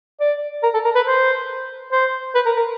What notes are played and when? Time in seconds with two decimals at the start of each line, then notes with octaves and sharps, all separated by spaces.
0.20 D5
0.63 A#4
0.74 A4
0.85 A#4
0.95 B4
1.06 C5
1.92 C5
2.35 B4
2.46 A#4
2.56 A#4